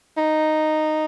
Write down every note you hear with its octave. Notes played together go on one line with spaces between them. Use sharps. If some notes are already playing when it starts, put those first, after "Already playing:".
D#4